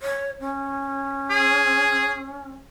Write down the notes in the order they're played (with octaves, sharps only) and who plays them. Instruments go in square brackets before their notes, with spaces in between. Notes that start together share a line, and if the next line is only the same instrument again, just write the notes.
[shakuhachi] C#5
C#4
[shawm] G#4